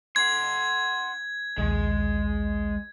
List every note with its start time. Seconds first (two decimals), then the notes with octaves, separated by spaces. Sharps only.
0.16 F#5 C6 G#6
1.58 A#1 D#2 G#3